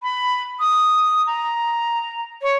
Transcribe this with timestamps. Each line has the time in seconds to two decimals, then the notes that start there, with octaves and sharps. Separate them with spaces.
0.02 B5
0.59 D#6
1.26 A#5
2.41 C#5